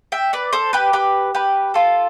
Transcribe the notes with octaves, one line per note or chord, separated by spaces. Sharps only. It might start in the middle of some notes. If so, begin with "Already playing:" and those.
E5 G5
B4 D5
A4 C5
G4 B4
G4 B4
G4 B4
F4 A4